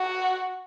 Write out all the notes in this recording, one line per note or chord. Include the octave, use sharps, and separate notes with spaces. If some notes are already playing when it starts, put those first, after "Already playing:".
Already playing: F#4